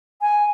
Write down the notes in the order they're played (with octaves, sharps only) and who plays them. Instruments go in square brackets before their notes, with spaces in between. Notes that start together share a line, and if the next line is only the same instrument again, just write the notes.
[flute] G#5